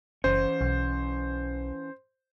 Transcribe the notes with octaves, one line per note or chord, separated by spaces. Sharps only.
F#1 E3 C#4 C5
B1